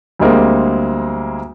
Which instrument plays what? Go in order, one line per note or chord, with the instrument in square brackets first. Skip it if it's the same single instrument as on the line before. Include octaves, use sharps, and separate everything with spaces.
[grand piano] D2 G3 G#3 A#3 C4